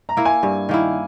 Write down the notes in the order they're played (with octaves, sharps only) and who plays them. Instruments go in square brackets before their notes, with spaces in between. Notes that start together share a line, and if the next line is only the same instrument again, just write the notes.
[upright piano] A#5
[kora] A#3 E4 A#4
[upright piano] G#5
[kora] G2
D#3 A#3 E4